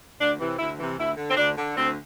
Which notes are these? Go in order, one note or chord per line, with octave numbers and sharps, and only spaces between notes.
D2 D4
C3 E3
D2 E4
C3 E3
D2 E4
D3
C4
D2 D4
D3
D2 C4